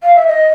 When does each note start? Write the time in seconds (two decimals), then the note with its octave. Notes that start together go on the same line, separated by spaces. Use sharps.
0.03 F5
0.15 E5
0.27 D#5